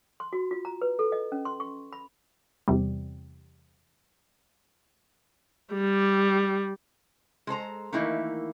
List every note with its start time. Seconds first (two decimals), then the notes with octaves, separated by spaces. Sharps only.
0.20 C6
0.33 F#4
0.51 F4
0.65 A#5
0.81 B4
0.99 A4
1.12 D#5
1.32 C#4
1.45 C6
1.60 C#6
1.93 B5
2.68 E2 C3 G3
5.73 G3
7.47 G#3 A4 C5 A#5
7.93 D#3 E3 A3 A#3 D#4 E4